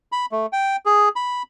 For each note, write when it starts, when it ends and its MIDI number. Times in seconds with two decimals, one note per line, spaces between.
0.12 0.26 83
0.32 0.46 57
0.53 0.76 79
0.86 1.09 68
1.16 1.43 83